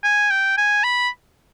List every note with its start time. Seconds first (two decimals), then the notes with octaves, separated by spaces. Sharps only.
0.04 G#5
0.30 G5
0.58 G#5
0.84 B5